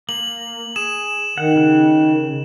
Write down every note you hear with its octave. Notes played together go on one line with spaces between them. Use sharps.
A#3 F#7
G#4 E7
D#3 F#5
C#3 F#6